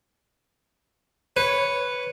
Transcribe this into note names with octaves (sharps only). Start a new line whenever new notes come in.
B4 C#5